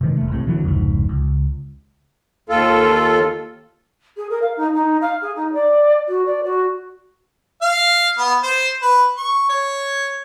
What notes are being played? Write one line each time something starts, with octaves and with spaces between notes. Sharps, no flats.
C3 D#3 G#3
F1 A3
B1 A2 C3
D3 E3 F#3
F1 C#2 G#2
C#2
D#2 F4 A4
G#4
A#4
F5
D#4
D#4
F5
G#4
D#4
D5
F#4
D5
F#4
F5
B3
C5
B4
C#6
C#5